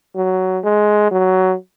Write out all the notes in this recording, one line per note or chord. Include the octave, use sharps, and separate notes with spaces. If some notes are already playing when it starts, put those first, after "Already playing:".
F#3
G#3
F#3